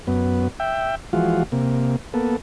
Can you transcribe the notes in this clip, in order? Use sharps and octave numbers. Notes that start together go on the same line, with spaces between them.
F#2 B3
E5 G5
E3 F3 G#3 F4 F#4
C3 A#3
A#3 B3 A4